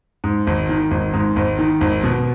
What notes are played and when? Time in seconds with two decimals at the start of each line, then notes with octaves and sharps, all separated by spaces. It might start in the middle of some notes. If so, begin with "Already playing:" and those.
0.24 G#2
0.47 G#1
0.69 D#3
0.91 G#1
1.14 G#2
1.36 G#1
1.59 D#3
1.81 G#1
2.03 B2